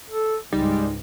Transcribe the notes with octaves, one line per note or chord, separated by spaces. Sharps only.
A4
C#2 G#2 G3 G#3 D#4